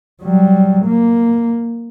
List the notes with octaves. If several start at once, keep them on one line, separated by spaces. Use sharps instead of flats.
F#3 G3
A#3